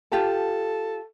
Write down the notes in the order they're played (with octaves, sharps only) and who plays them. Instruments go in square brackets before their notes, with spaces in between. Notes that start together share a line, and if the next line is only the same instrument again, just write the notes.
[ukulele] F4 G4 A5 [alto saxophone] A4